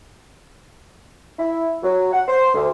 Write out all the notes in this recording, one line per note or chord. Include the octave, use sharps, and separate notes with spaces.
E4
F#3
F#5
C5
D2